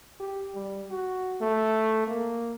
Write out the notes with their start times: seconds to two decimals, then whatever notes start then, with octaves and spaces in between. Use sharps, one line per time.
0.20 G4
0.55 G3
0.90 F#4
1.41 A3
2.07 A#3